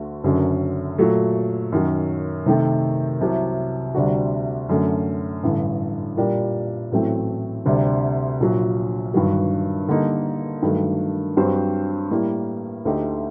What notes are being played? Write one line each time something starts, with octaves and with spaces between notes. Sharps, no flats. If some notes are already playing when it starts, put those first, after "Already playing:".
Already playing: D2 D3 A3 F#4
F#1 F#2 D3 F#3
A#2 F#3 A3
F#2 D#3 F#3
C3 D#3 A3 C4
C2 C3 F#3
D2 C3 G3 D4 F#4
F#2 D3 A3
A1 G2 D3
A#2 G3 D4 G4 A#4
A1 A2 F#3 A3 C4
D2 C3 G3 D4
A#1 A#2 F#3
G1 G2 D#3 F#3
D3 G3 A#3 D#4
G2 D#3 F#3 A3
G2 F#3 C4 G4 C5
A2 G3 A#3
D2 D3 A3 D#4 G4